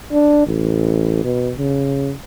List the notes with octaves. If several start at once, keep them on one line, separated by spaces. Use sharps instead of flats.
D4
A1
B2
C#3